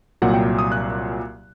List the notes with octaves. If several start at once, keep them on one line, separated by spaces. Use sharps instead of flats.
C2 A#2 F#3 F#5
G5
D#6
F#6